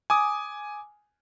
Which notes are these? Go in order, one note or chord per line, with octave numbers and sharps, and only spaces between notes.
G#5 D6 D#6